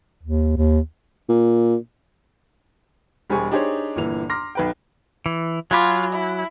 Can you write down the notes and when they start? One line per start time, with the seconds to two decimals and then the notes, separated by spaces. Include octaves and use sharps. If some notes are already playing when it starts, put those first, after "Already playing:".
0.23 D#2
0.57 D#2
1.29 A#2
3.30 E1 G3 G#4 C5 G#5 C#6
3.51 D4 D#4 G4 G#4 C5 C#5
3.96 G1 A#2 E3 F7
4.30 A#5 C6 D6 F6 A#6
4.55 B1 B4 G5
5.26 E3
5.71 F#3 F4 F#4 G#5 B5 D6
6.13 E4